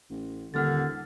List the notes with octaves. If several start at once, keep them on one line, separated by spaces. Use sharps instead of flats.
A1
D#1 D3 F#5 F6 A6